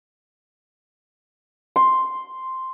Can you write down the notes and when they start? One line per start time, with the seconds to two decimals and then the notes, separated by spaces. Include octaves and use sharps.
1.76 C6